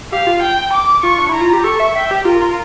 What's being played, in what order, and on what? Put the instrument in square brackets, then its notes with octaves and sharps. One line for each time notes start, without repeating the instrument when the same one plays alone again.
[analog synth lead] G4 [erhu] F5
[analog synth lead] F4
[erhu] G5
D6
[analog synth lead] F4 [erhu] C#6
[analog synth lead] D4
[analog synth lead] E4 [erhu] A#5
[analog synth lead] F4
G4
[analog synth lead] A4 [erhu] C#6
[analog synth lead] E5
[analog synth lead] E5 [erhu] G5
[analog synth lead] G4
[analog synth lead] F4 [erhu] A#4
[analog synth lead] F4